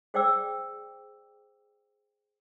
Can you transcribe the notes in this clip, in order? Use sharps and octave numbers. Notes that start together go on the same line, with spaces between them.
G#4 C5 D5 G5 D6 E6